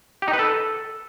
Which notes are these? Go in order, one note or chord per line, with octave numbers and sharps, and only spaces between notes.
G4
D#4
B4
A4